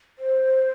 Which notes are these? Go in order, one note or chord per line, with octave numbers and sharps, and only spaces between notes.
C5